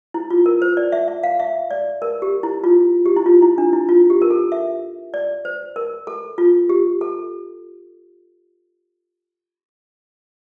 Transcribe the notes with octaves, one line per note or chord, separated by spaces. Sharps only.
E4
F4
A#4
C5
D5
E5
E5
F5
E5
D5
A#4
G4
E4
F4
G4
E4
F4
E4
D4
E4
F4
G4
A#4
A4
E5
D5
C5
A#4
A4
F4
G4
A4